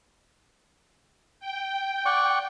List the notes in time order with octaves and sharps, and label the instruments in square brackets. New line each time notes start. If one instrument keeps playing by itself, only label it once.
[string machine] G5
[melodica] D5 F#5 C#6